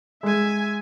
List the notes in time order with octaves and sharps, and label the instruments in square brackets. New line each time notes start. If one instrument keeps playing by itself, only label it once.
[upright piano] G#3 [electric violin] E5 G#5